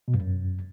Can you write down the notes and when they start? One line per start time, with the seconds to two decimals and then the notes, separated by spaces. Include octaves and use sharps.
0.08 B2
0.14 G2
0.21 F#2